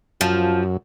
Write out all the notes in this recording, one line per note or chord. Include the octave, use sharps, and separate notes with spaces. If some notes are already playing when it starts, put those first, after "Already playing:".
F#2 F3